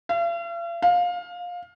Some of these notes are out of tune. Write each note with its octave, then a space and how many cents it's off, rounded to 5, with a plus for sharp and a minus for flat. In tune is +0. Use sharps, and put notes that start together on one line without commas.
F5 -45
F5 +20